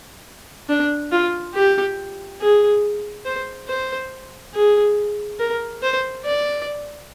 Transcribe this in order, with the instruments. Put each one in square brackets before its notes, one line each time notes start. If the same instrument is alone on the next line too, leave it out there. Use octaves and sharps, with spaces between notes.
[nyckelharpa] D4
F4
G4
G#4
C5
C5
G#4
A#4
C5
D5